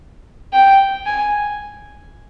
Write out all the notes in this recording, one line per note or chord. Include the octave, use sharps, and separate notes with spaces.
G5
G#5